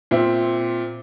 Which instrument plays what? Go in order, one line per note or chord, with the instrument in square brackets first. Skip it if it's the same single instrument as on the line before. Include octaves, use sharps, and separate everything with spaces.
[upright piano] A#2 C4 E5